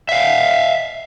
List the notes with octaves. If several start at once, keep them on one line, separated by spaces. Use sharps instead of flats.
E5 F5